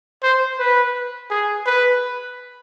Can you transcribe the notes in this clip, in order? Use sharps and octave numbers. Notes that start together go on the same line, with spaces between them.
C5
B4
G#4
B4